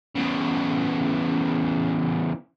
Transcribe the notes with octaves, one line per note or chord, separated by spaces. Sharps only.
E2 C#3